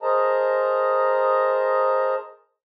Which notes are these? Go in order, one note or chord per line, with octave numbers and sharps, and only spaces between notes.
G#4 A#4 C5 D#5 A5 A#5